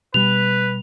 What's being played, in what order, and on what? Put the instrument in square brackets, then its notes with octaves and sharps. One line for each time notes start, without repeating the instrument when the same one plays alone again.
[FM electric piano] B2 G3 [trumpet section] B4 [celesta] F7